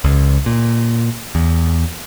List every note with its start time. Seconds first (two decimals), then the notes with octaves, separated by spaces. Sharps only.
0.04 C#2
0.46 A#2
1.35 E2